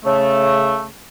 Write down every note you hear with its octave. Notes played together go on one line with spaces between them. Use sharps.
C#3 A3